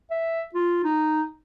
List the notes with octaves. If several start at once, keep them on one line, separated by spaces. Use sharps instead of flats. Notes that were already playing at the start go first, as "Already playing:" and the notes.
E5
F4
D#4